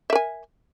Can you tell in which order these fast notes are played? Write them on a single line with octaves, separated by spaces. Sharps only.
E5 A#4 G#5